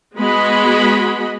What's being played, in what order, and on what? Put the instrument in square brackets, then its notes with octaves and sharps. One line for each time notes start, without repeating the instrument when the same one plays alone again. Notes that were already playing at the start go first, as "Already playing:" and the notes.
[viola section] G#3 B3 F#4 G#4 D#5 B5